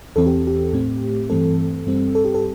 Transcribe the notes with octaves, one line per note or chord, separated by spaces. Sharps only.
E2 E3 C4 A4
G4
G4
A2 A3 C4
G2 E3 A3 C4 A4
G2 G3 C4
A4
G4
A4